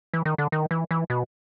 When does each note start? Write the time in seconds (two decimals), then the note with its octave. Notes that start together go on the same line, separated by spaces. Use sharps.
0.14 E3
0.25 D#3
0.38 D3
0.52 D#3
0.71 E3
0.91 E3
1.10 B2